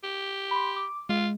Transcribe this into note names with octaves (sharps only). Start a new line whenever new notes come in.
G4
B5 C6
D6
G#3 F4